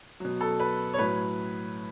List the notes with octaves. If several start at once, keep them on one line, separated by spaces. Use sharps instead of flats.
B2 F#3
A4
B4
C#5
A2 F#3 B4